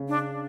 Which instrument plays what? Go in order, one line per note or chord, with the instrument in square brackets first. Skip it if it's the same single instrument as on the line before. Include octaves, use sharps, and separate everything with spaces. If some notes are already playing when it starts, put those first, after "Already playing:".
Already playing: [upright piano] C#3
[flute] D4